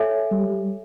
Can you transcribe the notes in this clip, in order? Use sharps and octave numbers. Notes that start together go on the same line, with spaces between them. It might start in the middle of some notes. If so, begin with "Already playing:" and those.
Already playing: A4 C#5 E5 G#5
G3